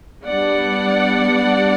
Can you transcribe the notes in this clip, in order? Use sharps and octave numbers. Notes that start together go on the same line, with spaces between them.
G3 B3 D4 D5 F#5